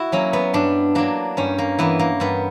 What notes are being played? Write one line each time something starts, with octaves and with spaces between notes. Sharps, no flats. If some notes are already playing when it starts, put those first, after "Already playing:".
Already playing: E4 F#4
F#3 A#3 C#4
B3
G2 D4
F#3 A#3 D4
G2 C#4
A#3
E3 A#3 B3
A#3
G2 B3